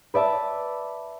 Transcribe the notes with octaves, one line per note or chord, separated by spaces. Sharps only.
B4 D5 E5 A5